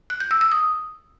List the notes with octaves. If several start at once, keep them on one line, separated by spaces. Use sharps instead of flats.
F#6
G6
E6
E6
D#6